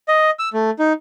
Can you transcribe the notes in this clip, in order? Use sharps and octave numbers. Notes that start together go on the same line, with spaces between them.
D#5
E6
A3
D#4